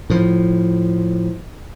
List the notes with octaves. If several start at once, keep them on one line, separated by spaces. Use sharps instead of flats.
A2 F3